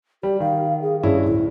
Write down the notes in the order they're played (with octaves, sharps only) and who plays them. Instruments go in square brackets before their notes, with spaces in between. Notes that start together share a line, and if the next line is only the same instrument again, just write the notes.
[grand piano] G3 [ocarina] G4
[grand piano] D#3 [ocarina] F5
[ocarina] G#4
[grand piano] G2 C#4 E4 [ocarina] G#4
[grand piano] D1 [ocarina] E4